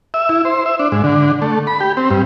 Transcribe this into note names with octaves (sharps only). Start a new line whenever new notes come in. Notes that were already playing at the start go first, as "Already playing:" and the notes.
E5
E4
C5
E5
D4
G#2
D3
A3
B5
G4
C4
G2